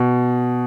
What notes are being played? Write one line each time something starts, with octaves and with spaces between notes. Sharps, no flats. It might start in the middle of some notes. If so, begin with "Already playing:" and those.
Already playing: B2